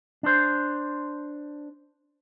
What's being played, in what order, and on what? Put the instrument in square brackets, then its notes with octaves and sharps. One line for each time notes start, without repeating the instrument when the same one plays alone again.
[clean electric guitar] D4 C5